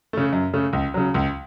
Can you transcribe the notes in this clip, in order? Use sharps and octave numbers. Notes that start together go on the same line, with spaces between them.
C#3 A3
F#2
C#3 A3
C#2
C#3 F#3
C#2